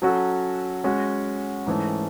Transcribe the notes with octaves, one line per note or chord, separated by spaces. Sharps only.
F#3 C#4 F#4 A4
G#3 C#4 F#4
G#2 E3 A3 C#4